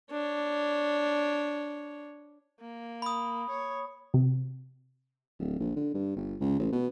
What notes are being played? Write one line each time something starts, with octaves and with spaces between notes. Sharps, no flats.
D4 C#5
A#3
B5 D#6
C#5
C3
D1
A#1
D3
G2
G1
C#2
A1
B2